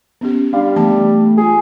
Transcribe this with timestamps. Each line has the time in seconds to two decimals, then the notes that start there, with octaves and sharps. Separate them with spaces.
0.21 B3 C#4 G4
0.53 G3 D4 F5
0.76 E3 A3 B3 A5
1.37 F4 G#4